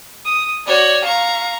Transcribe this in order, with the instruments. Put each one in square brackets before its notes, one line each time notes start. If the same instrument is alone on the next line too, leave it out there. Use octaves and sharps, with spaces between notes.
[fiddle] D#6
[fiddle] F#4 C#5 [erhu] D5
[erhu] F5 [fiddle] A#5 C#6